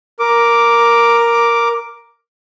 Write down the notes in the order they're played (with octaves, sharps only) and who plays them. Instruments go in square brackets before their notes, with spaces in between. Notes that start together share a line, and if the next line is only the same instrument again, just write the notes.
[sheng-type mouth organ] A#4 D6